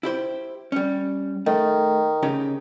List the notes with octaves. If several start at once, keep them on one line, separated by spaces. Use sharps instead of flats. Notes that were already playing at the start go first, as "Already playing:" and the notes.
E4 G4 C5
G3 C#4
D#3 A3
C#3 D#4 G4